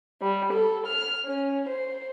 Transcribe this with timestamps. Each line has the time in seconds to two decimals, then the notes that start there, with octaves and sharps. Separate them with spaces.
0.21 G3
0.53 A4
0.86 F6
1.24 C#4
1.69 C5